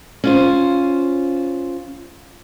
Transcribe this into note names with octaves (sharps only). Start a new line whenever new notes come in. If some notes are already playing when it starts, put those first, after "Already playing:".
C#4 F4 C5